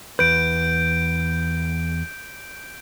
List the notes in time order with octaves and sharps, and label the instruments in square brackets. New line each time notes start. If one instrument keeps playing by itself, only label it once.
[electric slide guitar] E2 B4 [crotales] G6 D7